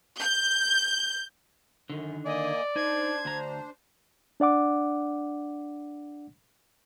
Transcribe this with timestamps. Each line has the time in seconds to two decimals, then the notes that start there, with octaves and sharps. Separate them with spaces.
0.20 G6
1.90 F#2 D3 D#3
2.26 A#3 D5 D#5 G#5
2.76 D4 D#4 C5 G#6
3.25 D2 A#5
4.40 D4 D5 F#5 D6